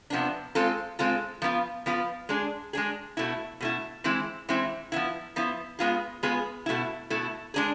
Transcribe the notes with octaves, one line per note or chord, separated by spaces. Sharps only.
C3 F3 B3 D4
G#3 C4 F4 A4
G#3 C4 F4 A4
F3 B3 F4
F3 B3 F4
G#3 D4 G#4
G#3 D4 G#4
B2 A3 E4
B2 A3 E4
E3 G#3 C4 E4
E3 G#3 C4 E4
F3 B3 E4
F3 B3 E4
G#3 B3 F4 G#4
G#3 B3 F4 G#4
B2 A3 E4
B2 A3 E4
G#3 D4 G#4